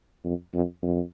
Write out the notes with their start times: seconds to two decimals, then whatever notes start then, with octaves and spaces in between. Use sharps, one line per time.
0.25 F2
0.54 F2
0.83 F2